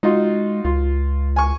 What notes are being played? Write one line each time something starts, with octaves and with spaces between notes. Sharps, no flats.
G#3 D#4 F4 F#4
C#2 F4
G#5 C#6